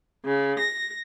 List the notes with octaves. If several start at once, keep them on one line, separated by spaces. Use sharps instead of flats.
C#3
A#6